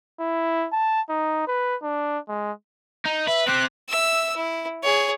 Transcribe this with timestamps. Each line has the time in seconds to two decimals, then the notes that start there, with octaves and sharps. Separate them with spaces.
0.20 E4
0.72 A5
1.10 D#4
1.47 B4
1.82 D4
2.29 G#3
3.06 D#4
3.28 B4 E5
3.47 C4 G4 F#6
3.89 E5 E6
4.36 E4
4.83 G#4 C#5